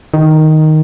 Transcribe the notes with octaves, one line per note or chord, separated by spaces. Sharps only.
D#3